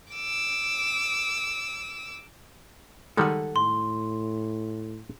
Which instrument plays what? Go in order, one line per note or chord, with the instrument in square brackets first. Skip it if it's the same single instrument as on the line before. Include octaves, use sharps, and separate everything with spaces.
[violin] D6 E6
[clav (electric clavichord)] D#3 G3 G#3 [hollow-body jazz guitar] A4 F#5
[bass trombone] A2 [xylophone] C6